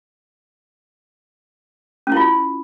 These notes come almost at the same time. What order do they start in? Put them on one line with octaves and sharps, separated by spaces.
C#4 E4 F4